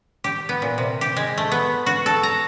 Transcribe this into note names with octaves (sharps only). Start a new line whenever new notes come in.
G4
B3
A#2
C3
G4
G#3
A3
B3
F#4
A4
A#5